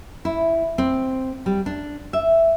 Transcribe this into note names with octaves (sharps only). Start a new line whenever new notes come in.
E4
C4
G3
D4
E5